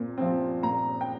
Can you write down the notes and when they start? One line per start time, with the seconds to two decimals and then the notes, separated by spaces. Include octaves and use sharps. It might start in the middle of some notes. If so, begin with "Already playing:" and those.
Already playing: A#2 C4
0.18 F3 C4
0.63 A#2 A#5
1.01 G5